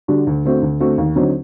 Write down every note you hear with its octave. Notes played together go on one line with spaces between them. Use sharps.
D3 G3 D4 F#4
D2
D3 A3 C4 F#4
D2
D3 A3 C4 F#4
D#2
D3 F#3 C4 D#4